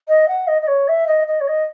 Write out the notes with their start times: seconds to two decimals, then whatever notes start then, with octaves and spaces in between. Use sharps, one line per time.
0.08 D#5
0.28 F#5
0.47 D#5
0.62 D#5
0.67 C#5
0.88 E5
1.07 D#5
1.27 D#5
1.40 C#5
1.48 D#5